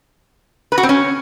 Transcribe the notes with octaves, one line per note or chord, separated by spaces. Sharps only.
B4
F#4
C4
C#4